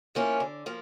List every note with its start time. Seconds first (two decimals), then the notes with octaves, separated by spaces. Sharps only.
0.15 F3 A#3 C#4 E4
0.40 D3
0.66 F3 A#3